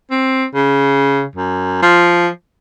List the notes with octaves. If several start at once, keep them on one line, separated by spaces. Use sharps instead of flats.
C4
C#3
F#2
F3